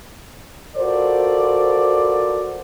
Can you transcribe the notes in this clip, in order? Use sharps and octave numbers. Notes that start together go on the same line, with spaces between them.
F4 F#4 A4 A#4 C5 D5